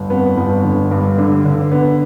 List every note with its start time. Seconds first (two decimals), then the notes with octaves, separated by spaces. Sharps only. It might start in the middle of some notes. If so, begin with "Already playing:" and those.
Already playing: G1
0.10 F2 B3
0.37 G1
0.64 D3
0.91 G2
1.18 D3
1.45 D3
1.72 D3 B3